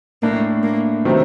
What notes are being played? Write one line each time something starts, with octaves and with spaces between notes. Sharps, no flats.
A2 A3 A#3 D4
A#3
C3 D#3 F#3 A3 C4